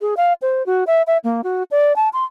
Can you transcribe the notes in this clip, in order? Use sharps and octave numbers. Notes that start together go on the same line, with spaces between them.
G#4
F5
C5
F#4
E5
E5
A#3
F#4
D5
A5
C6